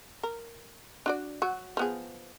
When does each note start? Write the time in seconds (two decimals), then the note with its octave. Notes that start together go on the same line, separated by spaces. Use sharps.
0.23 A#4
1.06 D4 F#4 D5
1.42 F#3 F#4
1.77 F3 B3 G#4